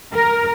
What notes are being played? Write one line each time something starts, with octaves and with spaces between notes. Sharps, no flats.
A#4